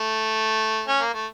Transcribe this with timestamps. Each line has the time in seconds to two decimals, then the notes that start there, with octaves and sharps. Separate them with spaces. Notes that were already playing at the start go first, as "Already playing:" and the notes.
Already playing: A3
0.88 C#4
1.01 A#3
1.14 A3